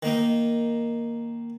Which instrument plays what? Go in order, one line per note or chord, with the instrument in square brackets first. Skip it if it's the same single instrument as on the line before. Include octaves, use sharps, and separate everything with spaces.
[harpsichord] D#3 A#3 D#4